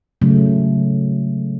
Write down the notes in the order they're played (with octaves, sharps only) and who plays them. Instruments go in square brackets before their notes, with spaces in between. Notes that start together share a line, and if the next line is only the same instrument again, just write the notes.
[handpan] C#3 F#3 A3